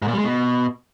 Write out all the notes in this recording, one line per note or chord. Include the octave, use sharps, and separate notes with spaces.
G#2
A#2
G3
G#3
B2